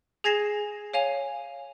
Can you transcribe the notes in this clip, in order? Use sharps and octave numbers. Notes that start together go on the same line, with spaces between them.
G#4 G#5 G#6 A#6 C7 E7
C#5 F5 G#5 F7